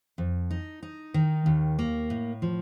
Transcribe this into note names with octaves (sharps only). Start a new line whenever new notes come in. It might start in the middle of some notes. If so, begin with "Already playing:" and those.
F2
D#4
D#4
D#3
D#2
A#3
A2
F3